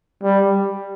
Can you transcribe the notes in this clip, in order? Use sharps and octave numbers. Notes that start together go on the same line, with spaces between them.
G3